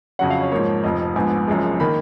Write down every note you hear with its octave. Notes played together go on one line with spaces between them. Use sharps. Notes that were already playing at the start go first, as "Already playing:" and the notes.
F2 C#3 F#3 C#4 F#5
F5
C#5
G#2 F3 A#3 C#5
F1 F2 F3 D#5
A#1 G#2 F3 B3 G#5
F#1 F#2 F3 G#3
D#3 A#3 B5